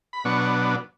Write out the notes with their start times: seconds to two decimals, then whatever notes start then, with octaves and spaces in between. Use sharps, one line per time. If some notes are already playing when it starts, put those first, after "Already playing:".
0.13 B5
0.24 B2 F#3 B3 D4 C#6